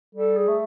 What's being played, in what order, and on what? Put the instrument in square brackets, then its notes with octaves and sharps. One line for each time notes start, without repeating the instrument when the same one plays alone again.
[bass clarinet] G3 [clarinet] A4
[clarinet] G#4
[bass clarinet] A3